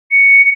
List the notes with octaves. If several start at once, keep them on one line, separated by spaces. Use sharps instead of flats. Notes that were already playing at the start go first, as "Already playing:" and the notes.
C#7